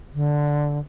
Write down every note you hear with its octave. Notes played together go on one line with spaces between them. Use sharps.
D3